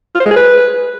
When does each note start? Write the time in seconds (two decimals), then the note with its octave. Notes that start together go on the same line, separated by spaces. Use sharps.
0.15 F4
0.20 C5
0.26 G#3
0.31 G#4
0.36 B4